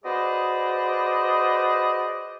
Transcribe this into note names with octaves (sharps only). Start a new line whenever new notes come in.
F#4 G#4 B4 C5 D5 D#5